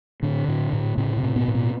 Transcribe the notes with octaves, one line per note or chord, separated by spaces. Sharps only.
A2 D3 D4
A2
A2
A2 C#3 C#4
C3 C4
A2
B2 B3
A2
B2 B3